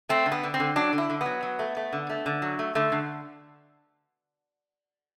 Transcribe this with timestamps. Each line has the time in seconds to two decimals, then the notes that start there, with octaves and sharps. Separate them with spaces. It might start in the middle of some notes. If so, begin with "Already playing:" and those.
0.09 A3 C4
0.26 D3
0.32 B3
0.43 D3
0.54 C4
0.60 D3
0.76 F#3 D4
0.93 D3
0.98 E4
1.10 D3
1.21 F#3 B3
1.43 F#3
1.59 A3
1.77 A3
1.93 D3
2.10 A3
2.26 D3
2.42 F#3
2.59 A3
2.75 D3 A3
2.92 D3